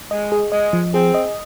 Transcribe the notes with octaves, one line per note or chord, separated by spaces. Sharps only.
G#3 D#5
G#4
G#3 D#5
F3
C4 G#4
D#5